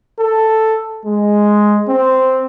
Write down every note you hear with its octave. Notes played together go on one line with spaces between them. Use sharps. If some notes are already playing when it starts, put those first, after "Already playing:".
A4
G#3
C4